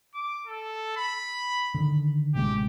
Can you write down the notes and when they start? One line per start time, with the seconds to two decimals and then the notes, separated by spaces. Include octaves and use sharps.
0.14 D6
0.47 A4
0.97 B5
1.74 D3 D#3
2.34 A1 C3 G#3 G4